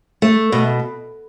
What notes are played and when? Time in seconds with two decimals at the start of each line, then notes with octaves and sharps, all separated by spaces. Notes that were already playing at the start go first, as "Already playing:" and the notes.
0.22 A3
0.52 B2